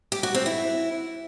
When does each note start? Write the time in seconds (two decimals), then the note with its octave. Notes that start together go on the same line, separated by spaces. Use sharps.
0.12 G4
0.23 F#4
0.34 C4
0.46 E4